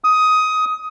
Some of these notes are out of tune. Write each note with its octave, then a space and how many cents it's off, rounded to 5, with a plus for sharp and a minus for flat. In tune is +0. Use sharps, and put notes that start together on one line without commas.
D#6 +15